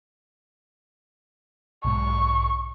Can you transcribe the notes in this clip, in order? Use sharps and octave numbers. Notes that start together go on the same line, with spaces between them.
B1 G#2 C#6